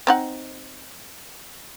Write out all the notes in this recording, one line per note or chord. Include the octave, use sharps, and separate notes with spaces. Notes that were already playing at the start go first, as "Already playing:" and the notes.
C4 D#4 F#5